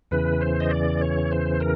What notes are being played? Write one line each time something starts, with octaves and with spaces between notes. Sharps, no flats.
E2 C#3 E3 B4
C5
D#5
D5
C#5
C5
A#4